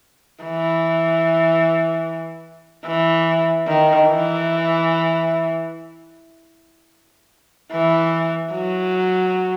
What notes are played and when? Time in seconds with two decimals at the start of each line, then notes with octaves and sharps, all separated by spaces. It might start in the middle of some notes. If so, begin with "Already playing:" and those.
0.44 E3
2.86 E3
3.67 D#3
4.08 E3
7.72 E3
8.52 F#3